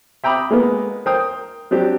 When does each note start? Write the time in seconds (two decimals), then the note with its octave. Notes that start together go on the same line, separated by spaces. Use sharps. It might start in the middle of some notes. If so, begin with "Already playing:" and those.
0.24 E5 G5 A#5 B5 D6 D#6
0.51 G#3 A#3 B3
1.06 A#4 C5 G5 D#6
1.71 F#3 C4 D4 G4